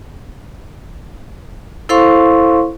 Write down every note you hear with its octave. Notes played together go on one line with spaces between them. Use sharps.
E4 A4 C5 F5 C6 C#6